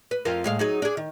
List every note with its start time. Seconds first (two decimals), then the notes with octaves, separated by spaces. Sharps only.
0.11 B4
0.25 F2 F4 A#4
0.44 A2 G#3 F5
0.59 F#3 D#4 G#4
0.82 D4 G#4
0.97 D#3